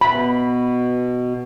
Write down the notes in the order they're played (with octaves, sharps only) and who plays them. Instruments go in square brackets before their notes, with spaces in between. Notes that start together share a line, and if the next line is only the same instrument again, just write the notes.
[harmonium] B2 [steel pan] B5